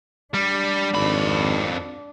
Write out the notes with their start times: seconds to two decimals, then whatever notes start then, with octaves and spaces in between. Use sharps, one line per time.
0.34 G3 D4
0.94 G#1 F2 B5